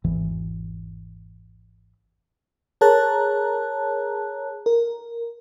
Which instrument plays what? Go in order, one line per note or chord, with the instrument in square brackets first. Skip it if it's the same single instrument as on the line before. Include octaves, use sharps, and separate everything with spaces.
[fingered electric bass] G#1 E2 E3
[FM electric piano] G#4 A#4 C#5 A5 A#5 F#6
A#4